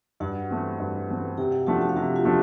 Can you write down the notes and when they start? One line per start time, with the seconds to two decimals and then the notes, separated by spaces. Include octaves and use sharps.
0.20 G2 F#4 F#5
0.50 E3 A3 C4
0.80 G2
1.08 E3 A3 C4
1.37 C3 G4 G5
1.52 F#4 F#5
1.67 F3 A3 D4 F#4 F#5
1.81 F#4 F#5
1.89 F5
1.96 C3 F#4 F#5
2.16 F4 F5
2.25 F3 A3 D4